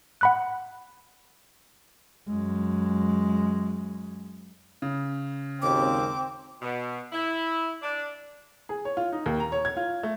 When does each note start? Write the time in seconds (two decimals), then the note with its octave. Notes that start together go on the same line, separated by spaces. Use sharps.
0.21 F#5 B5 F#6
2.28 F#2 G#3
4.82 C#3
5.62 G#1 D#2 C4 D6
6.62 B2
7.12 E4
7.82 D4
8.69 G#4
8.85 C#5
8.97 F4
9.12 D#4
9.26 D#2
9.40 A#5
9.52 C#5
9.65 G#6
9.77 F4
10.03 A3